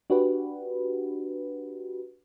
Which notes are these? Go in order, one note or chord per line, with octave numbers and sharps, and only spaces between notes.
D4 F#4 G4 B4